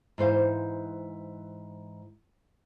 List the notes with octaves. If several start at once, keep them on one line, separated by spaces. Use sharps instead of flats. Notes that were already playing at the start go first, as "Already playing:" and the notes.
G#2 E3 C5 F5